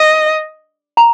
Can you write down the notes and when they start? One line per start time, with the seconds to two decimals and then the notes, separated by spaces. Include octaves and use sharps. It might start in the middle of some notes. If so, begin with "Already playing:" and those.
Already playing: D#5
0.97 A#5